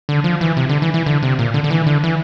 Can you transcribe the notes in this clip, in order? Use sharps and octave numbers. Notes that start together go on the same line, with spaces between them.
D3
F3
E3
C3
D3
E3
E3
D3
C3
A#2
D3
D3
E3
D3
E3